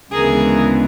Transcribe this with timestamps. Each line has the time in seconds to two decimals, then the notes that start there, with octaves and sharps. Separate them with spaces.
0.12 D2 C#3 E3 G#3 B3 G#4 A#4